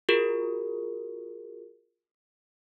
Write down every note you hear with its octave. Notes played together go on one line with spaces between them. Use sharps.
F4 F#4 G#4 A#4